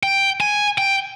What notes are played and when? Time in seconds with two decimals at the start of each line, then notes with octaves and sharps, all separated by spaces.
0.03 G5
0.40 G#5
0.78 G5